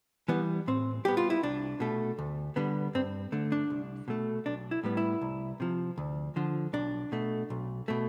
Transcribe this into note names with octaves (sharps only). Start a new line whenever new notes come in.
E3 G3 B3
A2 C4
G3 B3 G4
F4
E4
C2 D4
B2 A3
D2
D3 G3 B3
G2 C4
D3 A3
D4
C2
B2 A3
B1 D4
E4
A2 G3 B3
E4
C2
C3 F3
D2
D3 F3
B1 D4
B2 A3
B1
B2 A3